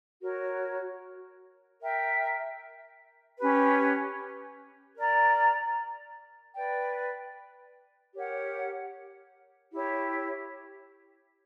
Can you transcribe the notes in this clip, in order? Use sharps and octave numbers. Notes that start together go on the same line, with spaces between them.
F#4 A#4 C#5
A#4 E5 G5
C#4 G4 B4
A#4 D5 A#5
B4 D5 G5
G4 A#4 C#5 F#5
E4 G4 C#5